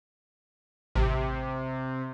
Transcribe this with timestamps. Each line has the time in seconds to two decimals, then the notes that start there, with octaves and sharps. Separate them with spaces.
0.95 A1 C3